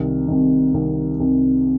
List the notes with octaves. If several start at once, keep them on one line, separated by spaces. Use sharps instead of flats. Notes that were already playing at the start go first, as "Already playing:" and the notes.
Already playing: C2 C3 D#3
C2 C3 D#3
C2 C3 D#3
C2 C3 D#3